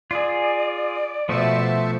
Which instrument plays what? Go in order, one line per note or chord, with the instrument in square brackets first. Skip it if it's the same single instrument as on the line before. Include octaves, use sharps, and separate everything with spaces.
[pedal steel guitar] F4 G#4 [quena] D5
[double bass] B2 [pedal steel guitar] F3 A3 F#4 [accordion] C5 E5 A5